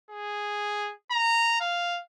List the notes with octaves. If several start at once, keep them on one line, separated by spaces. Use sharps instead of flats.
G#4
A#5
F5